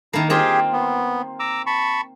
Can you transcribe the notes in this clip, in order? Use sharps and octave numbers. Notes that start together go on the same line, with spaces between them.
D#3 A#3 E4 A5
A#3 C4 F4 G4 G#4
B3
A#5 D6 E6
A5 B5 C#6